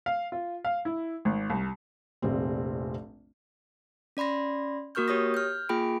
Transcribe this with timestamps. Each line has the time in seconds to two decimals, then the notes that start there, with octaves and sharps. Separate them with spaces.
0.06 F5
0.32 F4
0.65 F5
0.85 E4
1.25 G#1
1.50 C2
2.22 F1 A#1 C4
4.17 C#4 D5 B5 C6 A#6
4.95 A#3 F#4 A#4 C#6 F6 G6
5.08 G4 C#5 D#6 A#6
5.34 F6 G6
5.69 A#3 F4 G#4 G5 B5 D7